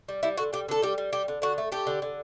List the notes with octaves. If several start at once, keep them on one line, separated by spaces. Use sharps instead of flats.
G3
G3 E4
D3 F#4
G3 G4
D3 A4
G3 G4
G3
G3 G4
D3
D3 F#4
A3
A3 G4
D3
D3